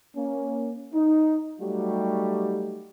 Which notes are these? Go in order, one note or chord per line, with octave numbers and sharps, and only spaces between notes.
A#3 C#4
D#4
F#3 G3 A3 D#4 F#4 G4